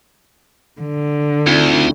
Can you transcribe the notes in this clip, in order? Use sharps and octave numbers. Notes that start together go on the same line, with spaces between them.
D3
D2 C4 D#4 F4